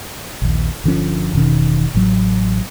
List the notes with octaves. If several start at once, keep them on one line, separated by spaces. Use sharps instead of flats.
A#1 D#2
G1 D3 F3 C#4
E1 B2 D#3 C#4
A1 A2 E3 F#3